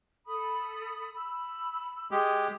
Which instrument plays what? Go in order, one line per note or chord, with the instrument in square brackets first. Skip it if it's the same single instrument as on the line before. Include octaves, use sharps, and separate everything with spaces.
[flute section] A4 B5 D#6
B5 E6
[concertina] G#3 G4 [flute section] D#6